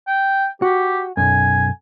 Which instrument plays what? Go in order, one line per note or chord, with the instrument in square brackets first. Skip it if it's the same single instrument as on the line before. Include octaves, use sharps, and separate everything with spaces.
[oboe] G5
[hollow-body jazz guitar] F#4 [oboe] G4
[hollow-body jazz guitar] B1 F#2 [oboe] G#5